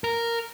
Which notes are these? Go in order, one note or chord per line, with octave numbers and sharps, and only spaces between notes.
A#4